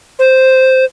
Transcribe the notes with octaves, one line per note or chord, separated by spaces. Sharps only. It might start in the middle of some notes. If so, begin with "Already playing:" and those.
C5